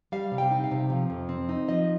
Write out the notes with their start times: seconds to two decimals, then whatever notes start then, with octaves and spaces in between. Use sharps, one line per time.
0.12 G3 F5
0.32 C3
0.38 G5
0.51 D#4
0.64 F5
0.71 C3
0.90 F3
1.10 F2
1.29 C4
1.49 D#4
1.68 F3 D#5